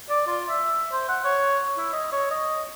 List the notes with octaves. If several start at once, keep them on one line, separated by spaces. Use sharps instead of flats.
D5
F4
E5
C5
F#5
C#5
E4
D#5
C#5
D#5